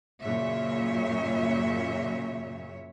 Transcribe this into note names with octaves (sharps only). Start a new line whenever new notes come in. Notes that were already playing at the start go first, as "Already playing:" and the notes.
F#2 A#2 C#3 C#5 E5